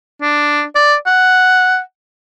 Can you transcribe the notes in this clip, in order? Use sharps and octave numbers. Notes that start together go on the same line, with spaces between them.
D4
D5
F#5